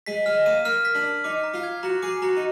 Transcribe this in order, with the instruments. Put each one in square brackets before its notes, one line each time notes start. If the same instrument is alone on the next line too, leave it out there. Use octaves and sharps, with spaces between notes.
[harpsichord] G#3 [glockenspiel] B6
[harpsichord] G#3 [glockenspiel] F6
[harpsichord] A#3 [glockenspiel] D#7
[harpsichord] A#3 [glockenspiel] F6
[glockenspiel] B6
[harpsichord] D4
[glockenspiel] F6
[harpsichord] D#4 [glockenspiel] D6
[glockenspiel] A#5
[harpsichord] F4
[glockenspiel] G#6
[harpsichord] F#4 [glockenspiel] A#5
[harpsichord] G#4 [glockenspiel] D6
[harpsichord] F#4 [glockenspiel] A#5
[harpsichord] D#4